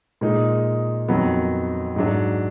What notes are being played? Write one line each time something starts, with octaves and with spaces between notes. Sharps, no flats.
A#2 G#3 D#4
F2 D#3 F#3 B3
G#2 F#3 D4